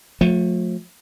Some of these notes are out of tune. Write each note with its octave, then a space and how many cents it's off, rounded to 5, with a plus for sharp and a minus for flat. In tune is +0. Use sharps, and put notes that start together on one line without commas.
F3 +40 A3 +0